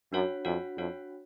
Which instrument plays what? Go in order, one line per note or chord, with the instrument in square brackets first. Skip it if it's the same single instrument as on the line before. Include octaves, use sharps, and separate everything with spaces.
[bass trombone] F#2 [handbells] D4 F#4 C#5 F#5
[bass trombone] F2 [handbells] D4 F#4 C#5 F#5
[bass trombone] F2 [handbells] D4 F#4 C#5 F#5